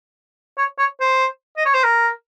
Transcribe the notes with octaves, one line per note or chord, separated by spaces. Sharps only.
C#5
C#5
C5
D#5
C#5
C5
A#4